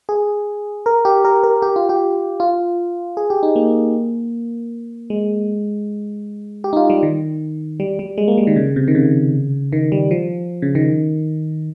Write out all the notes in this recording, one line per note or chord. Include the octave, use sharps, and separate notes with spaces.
G#4
A#4
G4
A#4
A#4
G4
F4
G4
F4
G#4
G4
D#4
A#3
G#3
G4
D#4
F4
G3
D#3
G3
G3
G#3
A#3
G3
D#3
C#3
C3
D#3
C#3
D#3
G3
F3
C#3
D#3